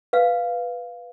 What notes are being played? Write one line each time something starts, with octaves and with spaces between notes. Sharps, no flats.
B4 F5